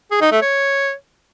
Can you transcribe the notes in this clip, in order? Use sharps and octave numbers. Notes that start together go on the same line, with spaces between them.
G#4
D#4
A3
C#5